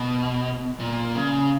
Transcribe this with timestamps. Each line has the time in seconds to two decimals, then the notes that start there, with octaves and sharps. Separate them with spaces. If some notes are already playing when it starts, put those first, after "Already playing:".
Already playing: B2
0.79 A#2
1.15 C#3